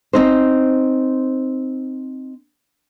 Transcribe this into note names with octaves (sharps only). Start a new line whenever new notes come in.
C4 D#4 C5